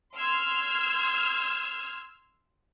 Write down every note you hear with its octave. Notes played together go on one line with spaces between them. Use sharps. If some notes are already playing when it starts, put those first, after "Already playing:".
C6 E6 F6 G#6